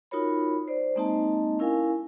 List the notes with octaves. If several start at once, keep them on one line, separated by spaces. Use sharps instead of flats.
D#4 F4 F#4 A#4 C#5 B5
C5 D5
G#3 A#3 C4 D#4 D#5 A5
C#4 E4 A#4 F5 G#5